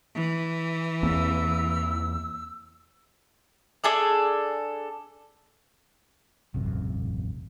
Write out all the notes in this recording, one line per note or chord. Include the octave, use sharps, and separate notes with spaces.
E3
E2 A#3 C4 E6
D4 G#4 A4 D5
E1 A1 F#2 C3